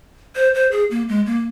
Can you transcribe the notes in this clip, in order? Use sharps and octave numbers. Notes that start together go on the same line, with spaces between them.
C5
C5
G#4
A#3
G#3
A#3